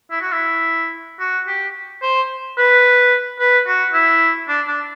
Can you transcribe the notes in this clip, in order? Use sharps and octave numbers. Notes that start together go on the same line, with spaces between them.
E4
F#4
E4
F#4
G4
C5
B4
B4
F#4
E4
D4
D4